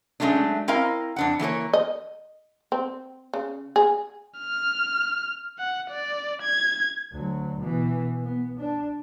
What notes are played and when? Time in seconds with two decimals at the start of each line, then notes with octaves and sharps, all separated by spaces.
0.20 F#3 G#3 A3 C#4 D4
0.68 C4 E4 A#4 D#5 F5 A#5
1.16 F2 D4 F#5
1.39 E3 A#3 A4 C#5
1.73 D#5
2.72 C4
3.34 C#3
3.76 G#4
4.39 F6
5.59 F#5
5.90 D5
6.42 G#6
7.13 D2 F#3
7.60 B2 E3
8.23 B3
8.60 D4